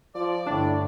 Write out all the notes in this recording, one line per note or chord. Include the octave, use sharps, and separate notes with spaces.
F3 D5
G1 A2 D4